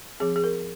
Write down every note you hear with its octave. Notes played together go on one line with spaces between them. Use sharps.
F3 C4 G#4
G#4
A#4